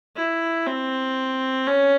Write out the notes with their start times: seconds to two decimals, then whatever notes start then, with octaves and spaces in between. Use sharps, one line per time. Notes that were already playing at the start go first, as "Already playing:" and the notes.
0.16 E4
0.66 C4
1.67 C#4